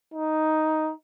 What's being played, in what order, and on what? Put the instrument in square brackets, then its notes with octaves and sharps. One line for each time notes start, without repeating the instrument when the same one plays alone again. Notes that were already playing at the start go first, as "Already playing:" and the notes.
[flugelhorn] D#4